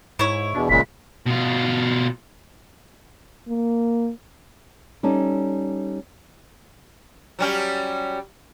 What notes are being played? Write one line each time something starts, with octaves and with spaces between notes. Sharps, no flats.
G#2 E4 C#5
E2 B2 D4
F1 A#2 C#3 G#3 B6
B2 F4
A#3
G3 C#4 D#4 A4
F#3 G3 C#4